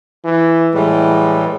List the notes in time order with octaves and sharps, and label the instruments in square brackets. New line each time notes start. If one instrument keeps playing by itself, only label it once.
[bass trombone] E3
[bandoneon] A2 E3 G3 [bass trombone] G#3